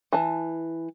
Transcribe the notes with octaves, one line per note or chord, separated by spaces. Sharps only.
E3 A5